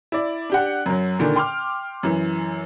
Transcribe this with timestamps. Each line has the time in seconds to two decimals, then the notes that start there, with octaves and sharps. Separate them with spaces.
0.12 E4 D5
0.50 D4 G4 F#5
0.86 F#2 F#3
1.19 A#2 D3 D#3
1.35 G5 C6 D6 F6
2.03 F#2 E3